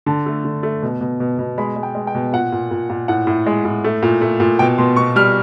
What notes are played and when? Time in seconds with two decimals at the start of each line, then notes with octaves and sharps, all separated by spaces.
0.06 D3 A5
0.26 A3
0.45 D3
0.63 A3
0.83 B2
1.01 B2
1.20 B2
1.38 B2
1.58 G#3 B5
1.76 G#3
1.83 G5
1.95 G#3
2.07 G5
2.15 B2
2.33 A#2 F#5
2.52 A#2
2.71 A#2
2.90 A#2
3.08 A2 F#5
3.27 A2
3.47 G#3
3.65 A2
3.84 A3
4.03 A#2
4.21 A3
4.40 A#2
4.59 B2 G5
4.78 B2 C6
4.96 B2 C#6
5.16 G3 F6